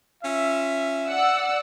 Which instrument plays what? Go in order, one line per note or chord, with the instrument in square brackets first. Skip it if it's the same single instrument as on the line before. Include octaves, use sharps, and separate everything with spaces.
[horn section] C#4 F4 E5
[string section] D5 F#5 E6